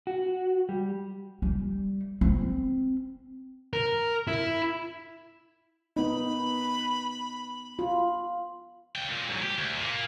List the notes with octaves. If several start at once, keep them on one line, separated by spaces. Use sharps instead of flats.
F#4
G3
G3
C4
A#4
E4
B3 D#4 B5
F4
C#2 G5
A#2
G#2 F#3
G4
D2
A#2 A#3